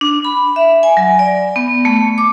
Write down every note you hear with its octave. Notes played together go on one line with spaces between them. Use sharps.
D4
B5
E5
G#5
F#3
D5
B3
A3
D6